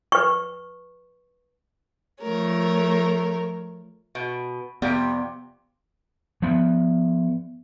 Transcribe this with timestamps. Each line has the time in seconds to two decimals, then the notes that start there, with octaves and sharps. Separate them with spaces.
0.12 B4 C#6
2.21 F3 A3 A#4 C#5
4.15 B2
4.82 F2 C3 G3 B3
6.42 F3 B3